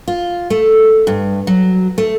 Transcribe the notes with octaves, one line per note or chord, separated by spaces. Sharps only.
F4
A3
G2
F#3
A3